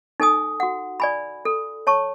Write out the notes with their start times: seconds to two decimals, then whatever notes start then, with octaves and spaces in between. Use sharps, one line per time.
0.20 D#4 A4 G#5 D#6
0.60 F#4 F#5
1.00 D5 G#5 B5
1.45 A4
1.87 C#5 A5 C#6